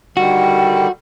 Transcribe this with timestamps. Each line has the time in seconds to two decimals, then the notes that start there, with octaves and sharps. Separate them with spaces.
0.17 D3 D#3 G3 F#4